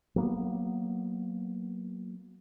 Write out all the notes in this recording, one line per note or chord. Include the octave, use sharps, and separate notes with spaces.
F#3 A#3 B3